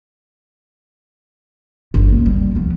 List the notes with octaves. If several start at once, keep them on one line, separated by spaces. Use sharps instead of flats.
G1 G#3
C#2 A#3
G3
F3 B3